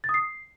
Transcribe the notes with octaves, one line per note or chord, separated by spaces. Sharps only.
A6
D#6
C7